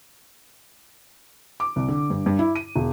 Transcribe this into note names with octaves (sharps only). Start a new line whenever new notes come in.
D6
C2
D3
G2
G2
E4
D#7
E1